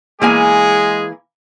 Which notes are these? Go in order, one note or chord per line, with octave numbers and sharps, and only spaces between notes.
E3 G#3 A#3 G#4 G#5